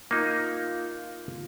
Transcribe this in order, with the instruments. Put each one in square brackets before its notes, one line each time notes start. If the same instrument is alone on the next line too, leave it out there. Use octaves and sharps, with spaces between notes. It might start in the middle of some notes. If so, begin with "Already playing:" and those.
[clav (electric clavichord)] A#3 D#4 [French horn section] F4